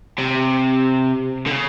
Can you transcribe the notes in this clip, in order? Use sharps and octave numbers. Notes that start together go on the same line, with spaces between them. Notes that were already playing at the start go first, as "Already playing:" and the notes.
C3
D3
C#3